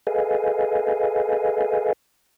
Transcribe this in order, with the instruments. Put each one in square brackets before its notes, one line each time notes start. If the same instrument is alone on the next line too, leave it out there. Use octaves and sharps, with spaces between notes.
[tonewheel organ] G#4 A4 B4 D#5 F5 G#5